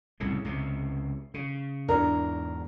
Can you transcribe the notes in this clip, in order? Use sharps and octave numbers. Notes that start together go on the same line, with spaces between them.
C2 A2 C#3
C#2 C3
C#3
E2 G#2 D4 A#4